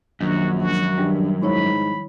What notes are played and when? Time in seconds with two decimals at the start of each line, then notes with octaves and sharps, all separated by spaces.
0.21 A#1 F#2 D#3 F#3 D4 F#4
0.60 F3 G#3 F#4
0.98 G2 D#3 G3
1.42 G#2 E4 C#5 B5 C#6